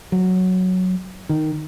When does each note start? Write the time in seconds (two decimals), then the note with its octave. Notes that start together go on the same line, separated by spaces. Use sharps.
0.12 F#3
1.29 D#3